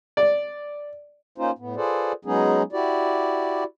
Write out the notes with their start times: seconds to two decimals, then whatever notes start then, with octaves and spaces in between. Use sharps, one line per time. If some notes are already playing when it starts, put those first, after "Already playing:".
0.17 D5
1.38 A#3 C#4 D#4 F4 C5
1.59 A2 B3
1.76 F4 G#4 A4 B4 C5 D5
2.25 F#3 G#3 B3 C#4 D#4 G#4
2.73 E4 F#4 G4 D5